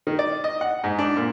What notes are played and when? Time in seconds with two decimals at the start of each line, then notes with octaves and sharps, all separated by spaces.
0.07 D#3
0.19 D5
0.44 D#5
0.61 F#5
0.84 G#2
0.99 D4
1.17 A#2